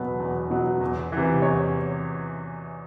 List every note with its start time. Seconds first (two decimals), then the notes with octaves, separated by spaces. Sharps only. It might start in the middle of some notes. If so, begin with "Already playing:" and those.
Already playing: E2 B2 F#3 B4
0.20 E2
0.50 B2 F#3
0.81 E2
1.12 C3 E3
1.42 E2 C#5